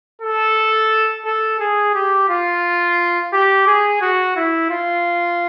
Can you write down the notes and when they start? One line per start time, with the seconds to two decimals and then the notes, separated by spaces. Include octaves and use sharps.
0.21 A4
1.25 A4
1.60 G#4
1.94 G4
2.29 F4
3.33 G4
3.67 G#4
4.01 F#4
4.36 E4
4.70 F4